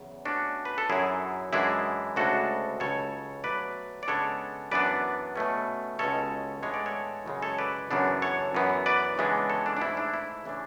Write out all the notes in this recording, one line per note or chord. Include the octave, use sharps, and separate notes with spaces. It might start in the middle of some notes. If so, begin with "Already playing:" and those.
Already playing: E2 C#3 F#3
B2 A3 C#4 D4 F#4
B4
A4
F#2 D3 F#3 E4 G#4
F#2 E3 G#3 D4 E4 G#4
D2 C#3 G#3 D4 F#4 A4
C#2 C#3 F#3 C#4 A4 C#5
B2 F#3 A3 B4 D5
D5
C#3 G#3 B3 D4 A4 C#5
F#2 E3 B3 D4 B4 D5
B2 A3 C#4
C#2 B2 G#3 C#4 A4 C#5
A2 E3 G#3 B3 D4 C#5
D5
A4 C#5
F#2 C#3 E3 G#3
A4 C#5
B4 D5
F#2 C#3 E3 B3 D4
A4 C#5
F#2 E3 B3
B4 D5
C#3 E3 G#3 B3 D4
A4 C#5
D4
D4
G#2 E3 A3 E4
D4
E4
C#3 E3 A3 D4